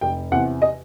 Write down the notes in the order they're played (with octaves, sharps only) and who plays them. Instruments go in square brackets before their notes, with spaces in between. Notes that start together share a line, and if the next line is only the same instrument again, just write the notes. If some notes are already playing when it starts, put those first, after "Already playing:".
[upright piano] F1 G5
E2 C3 F#5
D#5